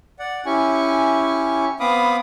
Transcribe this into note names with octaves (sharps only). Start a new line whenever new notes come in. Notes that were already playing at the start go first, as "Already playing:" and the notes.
D5 F#5
C#4 E4 G4 G#5 C#6
B3 C4 F5 B5 D6 D#6